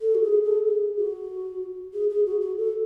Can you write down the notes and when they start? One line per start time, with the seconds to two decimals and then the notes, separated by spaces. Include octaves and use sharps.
0.01 A4
0.15 F#4
0.22 G#4
0.44 A4
0.66 G#4
0.97 F#4
1.94 G#4
2.09 G#4
2.26 F#4
2.41 F#4
2.57 A4